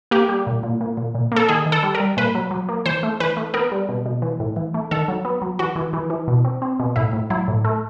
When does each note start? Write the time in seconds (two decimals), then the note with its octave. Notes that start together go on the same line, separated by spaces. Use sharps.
0.11 A#3 G4
0.29 G3
0.47 A#2
0.63 A#2
0.81 A#2
0.97 A#2
1.15 A#2
1.32 A#3 A4
1.49 D#3 G#4
1.66 D#3
1.72 A4
1.83 G3
1.95 A#4
2.00 G3
2.17 A#2 B4
2.35 F#3
2.51 F#3
2.69 A#3
2.86 E3 C5
3.03 A3
3.20 E3 B4
3.37 A3
3.54 B3 A#4
3.72 G3
3.89 B2
4.06 B2
4.22 E3
4.40 A2
4.56 E3
4.74 A3
4.91 D#3 A4
5.08 F#3
5.25 B3
5.42 F#3
5.59 E3 F#4
5.76 E3
5.93 E3
6.10 E3
6.28 B2
6.45 C4
6.62 C4
6.80 B2
6.96 A2 E4
7.13 A2
7.30 F#3 E4
7.48 A2
7.65 A3